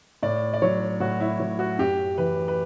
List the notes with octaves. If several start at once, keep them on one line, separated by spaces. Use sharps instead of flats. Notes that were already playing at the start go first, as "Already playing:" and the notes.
A2 D5
D5
F#3 C#5
A2 F#4
E4
F#3
F#4
F#2 G4
E3 B4
B4